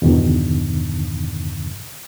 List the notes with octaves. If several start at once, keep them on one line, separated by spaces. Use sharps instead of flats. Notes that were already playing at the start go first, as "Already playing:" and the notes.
E2 G2 B2 D3 D#3